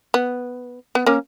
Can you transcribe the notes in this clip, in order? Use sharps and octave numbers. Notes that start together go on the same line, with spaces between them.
B3
B3
A#3 C#4